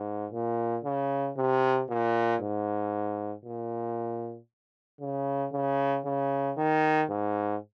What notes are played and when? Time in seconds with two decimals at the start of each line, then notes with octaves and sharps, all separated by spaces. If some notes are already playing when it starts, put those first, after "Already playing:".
Already playing: G#2
0.32 A#2
0.84 C#3
1.37 C3
1.89 A#2
2.41 G#2
3.45 A#2
5.01 C#3
5.53 C#3
6.05 C#3
6.57 D#3
7.09 G#2